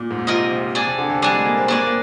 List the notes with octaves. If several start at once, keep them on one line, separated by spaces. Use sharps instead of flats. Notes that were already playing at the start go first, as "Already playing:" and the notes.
Already playing: A#2
G#2
A#2
C3 F4 A#4 D#5
C3
D4 G#4 D5
C3
D3
C3
G3 D4 G#4 D5
G#3
A#3
C4
A#3 D4 G#4 D5
C4
A#3